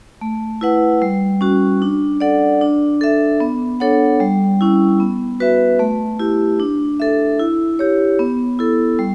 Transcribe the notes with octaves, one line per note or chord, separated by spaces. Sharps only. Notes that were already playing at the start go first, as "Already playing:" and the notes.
A3
E4 B4 F#5
G3
C#4 F#4
D4
A4 D5 F#5
D4
A4 E5
B3
D4 A4 C#5 F#5
G3
C#4 E4
B3
F#4 B4 E5
A3
E4 G4
D4
A4 E5
E4
G4 C#5
B3
E4 A4
G3